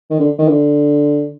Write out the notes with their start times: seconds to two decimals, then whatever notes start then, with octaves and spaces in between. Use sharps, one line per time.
0.10 D#3
0.20 D3
0.38 D#3
0.48 D3